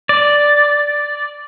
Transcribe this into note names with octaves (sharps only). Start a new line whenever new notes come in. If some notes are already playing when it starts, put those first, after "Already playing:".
D5